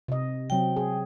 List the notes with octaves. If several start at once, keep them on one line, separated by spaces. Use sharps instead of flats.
C3 D#5
C3 F#3 C4 G5
G#4